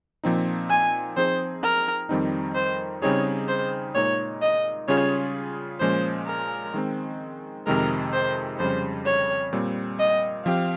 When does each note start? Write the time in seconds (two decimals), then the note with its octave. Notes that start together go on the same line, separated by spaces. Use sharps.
0.24 A#2 F3 C4 D#4
0.70 G#5
1.17 F3 C4 D#4 G#4 C5
1.63 A#4
2.09 F2 D#3 G3 C4 D#4
2.55 C5
3.02 C#3 G3 C4 D#4 G#4 C#5
3.49 C5
3.95 A#2 G#3 D#4 C#5
4.42 D#5
4.88 C#3 G3 C#4 F4 G#4 C#5
5.80 A#2 F3 G#3 C#4 C5
6.27 A#4
6.74 D#3 G#3 C4
7.67 F2 C3 D#3 G#3 A#4
8.14 C5
8.59 F2 C#3 G3 C5
9.06 C#5
9.53 A#2 G3 C4
9.99 D#5
10.45 F3 C4 G4 F5